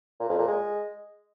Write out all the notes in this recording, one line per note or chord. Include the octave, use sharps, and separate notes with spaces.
A#2
F2
A#2
G#3